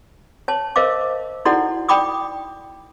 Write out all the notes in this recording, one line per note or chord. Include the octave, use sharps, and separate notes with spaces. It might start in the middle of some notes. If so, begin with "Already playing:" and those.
C#5 A5
A#4 C5 D#5 F5 D6
D#4 E4 F#4 A4 D5 F#5
D5 G5 B5 D6 D#6